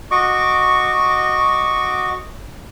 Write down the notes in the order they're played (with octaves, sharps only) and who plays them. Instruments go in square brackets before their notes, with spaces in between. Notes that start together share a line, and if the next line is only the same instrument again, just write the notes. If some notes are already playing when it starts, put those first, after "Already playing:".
[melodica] F#4 D#5 C#6 D6